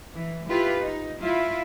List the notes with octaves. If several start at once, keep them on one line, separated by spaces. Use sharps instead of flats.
E3
E4 F4 G4 B4
D#4
E4 F4